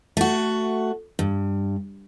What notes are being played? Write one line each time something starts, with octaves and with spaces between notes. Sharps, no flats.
A3 F#4
G2